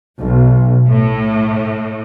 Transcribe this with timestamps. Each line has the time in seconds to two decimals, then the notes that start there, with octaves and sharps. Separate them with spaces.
0.19 B1
0.87 A2